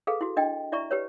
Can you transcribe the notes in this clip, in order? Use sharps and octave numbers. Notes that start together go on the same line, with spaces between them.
G#4 A4 B4 F5
E4 F#4
D4 D#5 G5
E4 D5 E5 A#5 C#6
G4 B4 C#5